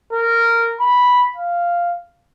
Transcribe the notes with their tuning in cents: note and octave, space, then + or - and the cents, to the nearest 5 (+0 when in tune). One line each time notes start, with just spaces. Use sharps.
A#4 -10
B5 -5
F5 -5